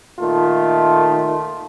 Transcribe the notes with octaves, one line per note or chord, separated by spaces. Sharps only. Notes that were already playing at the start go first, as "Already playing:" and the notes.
A#2 D#3 A3 F4